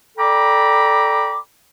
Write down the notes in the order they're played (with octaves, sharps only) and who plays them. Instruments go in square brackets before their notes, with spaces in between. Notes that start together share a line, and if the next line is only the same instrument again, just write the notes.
[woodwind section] A4 D5 G5 A#5 B5 D6